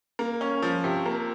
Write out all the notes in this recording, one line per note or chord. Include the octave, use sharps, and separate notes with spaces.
A#3
C#4
F3
C3
A#3